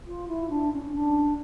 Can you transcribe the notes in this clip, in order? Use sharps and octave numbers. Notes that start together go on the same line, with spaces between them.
F4
E4
D4
C#4
D4